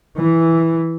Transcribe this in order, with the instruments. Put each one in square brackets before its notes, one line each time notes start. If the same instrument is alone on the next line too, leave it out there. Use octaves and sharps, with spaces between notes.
[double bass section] E3